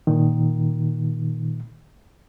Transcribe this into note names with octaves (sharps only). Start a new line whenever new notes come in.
A#2 D#3